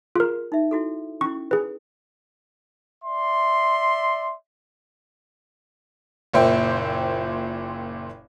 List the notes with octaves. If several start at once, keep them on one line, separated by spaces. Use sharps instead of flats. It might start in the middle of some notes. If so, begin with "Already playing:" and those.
F4 G#4 A#4
D#4 E5
E4 F#4 A4
C#4 E4 C#6
G#4 B4
D5 E5 C6
F#1 A#2 C5 E5 G5